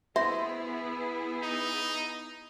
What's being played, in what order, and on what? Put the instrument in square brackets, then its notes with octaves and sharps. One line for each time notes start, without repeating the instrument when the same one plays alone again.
[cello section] B3 E4 G#4 [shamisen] C5 [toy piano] E5
[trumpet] D#4